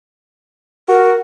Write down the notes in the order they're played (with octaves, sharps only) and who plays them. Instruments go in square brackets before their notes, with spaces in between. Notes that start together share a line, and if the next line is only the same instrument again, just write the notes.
[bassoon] F#4 [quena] A#4